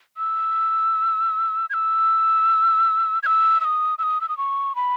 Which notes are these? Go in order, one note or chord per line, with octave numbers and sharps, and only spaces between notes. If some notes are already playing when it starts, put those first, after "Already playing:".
E6
G#6
E6
G#6
E6
E6
D#6
E6
D#6
E6
D#6
C#6
B5